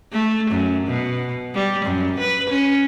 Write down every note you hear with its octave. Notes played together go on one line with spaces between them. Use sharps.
A3
F#2
B2
G3
F#2
B4
C#4